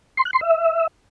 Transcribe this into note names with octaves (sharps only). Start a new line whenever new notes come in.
C6
F#6
C6
E5